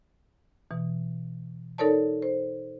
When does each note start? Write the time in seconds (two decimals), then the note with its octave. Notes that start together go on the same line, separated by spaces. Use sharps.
0.71 B2 E3
1.78 D#4 A4 A#4 C#5 D5 A5
2.22 C5